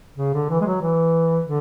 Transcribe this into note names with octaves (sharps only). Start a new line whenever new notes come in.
C#3
D3
E3
G#3
F#3
E3
D3